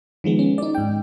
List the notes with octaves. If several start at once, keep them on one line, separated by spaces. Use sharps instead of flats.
D#3 F3 G#3 B3
C#4
D#4 D5
G#2 G5